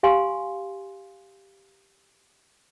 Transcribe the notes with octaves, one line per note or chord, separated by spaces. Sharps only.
G4 F5 G#5 C6